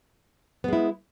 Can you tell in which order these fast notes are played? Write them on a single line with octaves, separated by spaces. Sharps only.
B3 G#3 E4